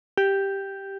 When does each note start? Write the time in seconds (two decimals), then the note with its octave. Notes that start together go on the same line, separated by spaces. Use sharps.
0.18 G4